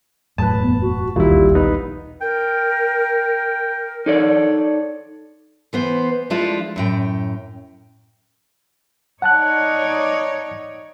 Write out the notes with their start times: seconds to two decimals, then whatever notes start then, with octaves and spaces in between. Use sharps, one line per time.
0.38 E1 F#2 A2 B4 A5
0.62 B3
0.82 F#4
1.16 E1 A#1 D#2 A#2 G3 E4
1.55 B3 D#4 B4
2.21 A#4 G5
4.06 D#4 A4 C#5 D5
5.73 E3 B3 C5
6.30 F3 G#3 A3 D4 E4 F4
6.76 F#2 A2 G5
9.22 D#4 C#5 D5 F#5 A5 F#6